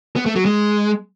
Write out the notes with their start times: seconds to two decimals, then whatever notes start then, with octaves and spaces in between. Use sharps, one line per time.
0.16 B3
0.26 A3
0.36 F#3
0.45 G#3